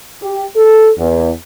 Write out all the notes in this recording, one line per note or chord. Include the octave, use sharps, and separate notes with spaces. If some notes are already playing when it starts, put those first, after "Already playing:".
G4
A4
E2